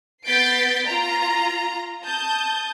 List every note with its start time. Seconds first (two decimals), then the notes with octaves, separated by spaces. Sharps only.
0.25 B3 G6 A6 B6 C7 D7
0.87 F4 A#5
2.04 A5 D#6 G6